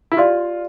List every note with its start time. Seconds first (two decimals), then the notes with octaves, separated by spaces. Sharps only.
0.12 E4
0.17 F4 G4 D5 F5 C6